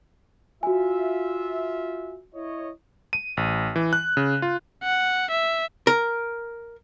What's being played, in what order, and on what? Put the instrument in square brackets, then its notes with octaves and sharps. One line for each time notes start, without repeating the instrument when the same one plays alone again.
[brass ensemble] F4 E5 [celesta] F#4 G#5
[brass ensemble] E4 C#5 D#5
[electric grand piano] D#7
A1
E3
F#6
C#3
F4
[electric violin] F#5
E5
[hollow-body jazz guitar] A#4